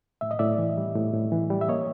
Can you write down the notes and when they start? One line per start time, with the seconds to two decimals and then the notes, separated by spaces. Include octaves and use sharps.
0.21 A2 E5
0.31 D#5
0.39 A2 D5 E5
0.58 E3
0.77 G3
0.96 A2
1.14 A2
1.32 E3
1.50 G3
1.61 E5
1.68 A#3 C#5 D#5